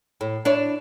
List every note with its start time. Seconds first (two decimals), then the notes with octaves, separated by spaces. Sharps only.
0.21 A2
0.45 D4 E4 C#5